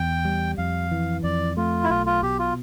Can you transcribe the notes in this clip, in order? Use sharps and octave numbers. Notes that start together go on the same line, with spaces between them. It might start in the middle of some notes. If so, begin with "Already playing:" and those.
Already playing: E2 G5
G3
F2 F5
E3
F2 D5
A3 F4
E4
B1 F4
F4
B2 G4
F4